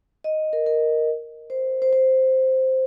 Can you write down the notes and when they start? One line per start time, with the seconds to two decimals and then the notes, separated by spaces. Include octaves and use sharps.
0.24 D#5
0.53 A#4
0.66 A#4
1.50 C5
1.82 C5
1.93 C5